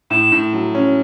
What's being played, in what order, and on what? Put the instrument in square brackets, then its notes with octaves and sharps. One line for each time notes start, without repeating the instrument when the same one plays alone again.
[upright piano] A2 [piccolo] E7
[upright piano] A2
F#3
C#4